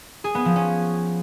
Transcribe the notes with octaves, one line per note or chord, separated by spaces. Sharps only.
G#4
B3
F3
C#4